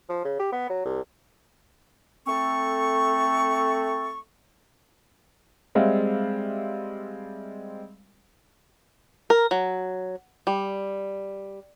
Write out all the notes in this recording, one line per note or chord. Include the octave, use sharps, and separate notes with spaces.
F3
C#3
G4
B3
F#3
C2
A3 C4 A4 C#6
G3 G#3 C4 E5 F5
A#4
F#3
G3